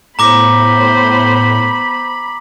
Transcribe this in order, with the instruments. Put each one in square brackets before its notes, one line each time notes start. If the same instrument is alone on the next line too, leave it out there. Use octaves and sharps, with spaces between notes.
[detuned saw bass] A2 [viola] B3 C5 [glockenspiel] A#5 D6 A#6 [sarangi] B5